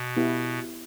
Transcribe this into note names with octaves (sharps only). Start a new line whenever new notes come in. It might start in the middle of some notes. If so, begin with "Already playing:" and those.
Already playing: B2
B3 E4 G4